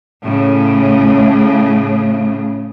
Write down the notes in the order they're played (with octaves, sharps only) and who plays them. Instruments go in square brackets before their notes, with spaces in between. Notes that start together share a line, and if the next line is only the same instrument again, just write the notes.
[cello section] A2 C#3